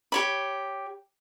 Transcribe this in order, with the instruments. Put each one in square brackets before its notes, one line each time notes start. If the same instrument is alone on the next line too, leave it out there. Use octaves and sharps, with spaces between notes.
[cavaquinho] G4 C#5 B5